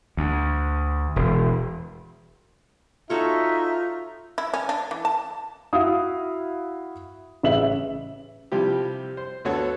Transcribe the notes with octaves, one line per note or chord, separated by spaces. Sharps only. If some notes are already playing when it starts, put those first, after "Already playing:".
D2
E1
D#4 F4 F#4 A4 C#5 E5
E4
C#4
D4
E3
A5
E4 F#4 F5 D#6
A1 C#3 E5 F#7
C3 F3 G3 E4 G4
C5
D2 B3 F#4 A4 C#5